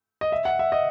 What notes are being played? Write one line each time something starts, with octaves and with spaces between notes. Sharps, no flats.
D#5
E5
F#5
E5
D#5